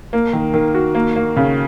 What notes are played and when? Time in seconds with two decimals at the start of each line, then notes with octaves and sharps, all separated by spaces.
0.13 A#3
0.33 D#3
0.54 D#3
0.74 F#4
0.95 A#3
1.16 A#3
1.36 C#3